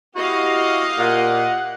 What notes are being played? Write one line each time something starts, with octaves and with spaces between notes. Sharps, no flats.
E4 F#4 G4 D#5 F5
A#2 F#5